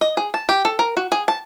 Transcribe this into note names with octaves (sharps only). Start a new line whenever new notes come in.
D#5
G#4
A5
G4
A4
A#4
F#4
G#4
A5